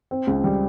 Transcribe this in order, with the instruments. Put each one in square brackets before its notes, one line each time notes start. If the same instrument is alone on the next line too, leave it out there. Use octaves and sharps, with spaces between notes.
[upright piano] C4
C#2
G3